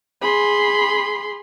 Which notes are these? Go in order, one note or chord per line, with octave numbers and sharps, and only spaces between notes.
G#4 B5 C6